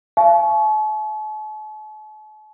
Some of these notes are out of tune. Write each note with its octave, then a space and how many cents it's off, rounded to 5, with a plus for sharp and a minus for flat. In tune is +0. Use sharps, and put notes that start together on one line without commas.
F5 -40 A5 -45 C#6 +0